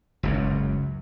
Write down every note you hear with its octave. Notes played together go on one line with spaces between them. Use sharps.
F#1 C#2 F#2